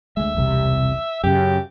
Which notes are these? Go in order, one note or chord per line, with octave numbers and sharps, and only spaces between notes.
D2 G#3 E5
E1 C2 C3
F#2 C#3 G4